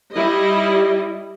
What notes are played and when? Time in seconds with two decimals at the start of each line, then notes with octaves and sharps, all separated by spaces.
0.14 G3 E4 D#5